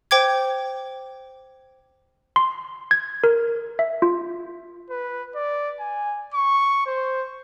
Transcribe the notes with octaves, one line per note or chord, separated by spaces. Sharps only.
C5 G5 D6 G#6
C6
G#6
A#4
E5
F4
B4
D5
G#5
C#6
C5